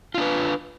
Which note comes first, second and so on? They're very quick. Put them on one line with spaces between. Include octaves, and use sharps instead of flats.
F4 D4 B4